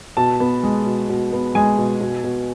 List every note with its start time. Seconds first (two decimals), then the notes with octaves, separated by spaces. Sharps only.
0.17 B2 A5
0.40 B3
0.63 G#3
0.86 B2
1.09 B2
1.33 B3
1.55 G#3 G#5
1.78 B2
2.01 B2
2.24 B2